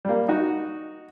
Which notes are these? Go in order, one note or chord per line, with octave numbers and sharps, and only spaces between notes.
G3 A#3
D#4 F#4